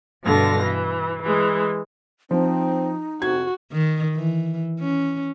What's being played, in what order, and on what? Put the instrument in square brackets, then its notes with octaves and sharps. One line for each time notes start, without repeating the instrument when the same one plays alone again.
[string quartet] G2 B2 D3 F5 A#6
E3
E3 G#3
[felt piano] F3 [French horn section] C4 [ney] D#4
[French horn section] F2 C3 [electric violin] F#4 [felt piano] G#6
[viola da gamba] D#3
E3
C#4